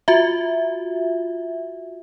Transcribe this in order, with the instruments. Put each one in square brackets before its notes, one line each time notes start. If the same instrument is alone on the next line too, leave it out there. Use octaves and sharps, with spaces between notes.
[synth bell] F4 F#4 E5